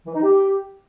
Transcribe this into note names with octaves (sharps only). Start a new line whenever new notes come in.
E3
D#4
G4